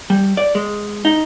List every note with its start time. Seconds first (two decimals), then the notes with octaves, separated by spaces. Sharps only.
0.10 G3
0.37 D5
0.55 G#3
1.05 D#4